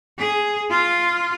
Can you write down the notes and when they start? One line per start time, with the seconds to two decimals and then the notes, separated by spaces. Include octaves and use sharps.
0.18 G#4
0.70 F4